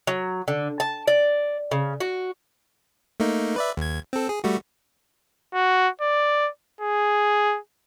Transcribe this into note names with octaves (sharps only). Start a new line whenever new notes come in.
F#3
D3
A5
D5
C#3
F#4
A3 A#3 D#4
B4 D5 E5
D#2 G#6
C4 A4
G#4
G3 A3 F#4
F#4
D5
G#4